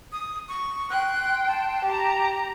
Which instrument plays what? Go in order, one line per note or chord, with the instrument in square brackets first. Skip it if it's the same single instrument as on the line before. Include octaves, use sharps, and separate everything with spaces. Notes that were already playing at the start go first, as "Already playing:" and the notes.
[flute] D#6
C#6
[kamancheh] G5 C6 [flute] F#6
[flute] A5
[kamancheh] G4 A#5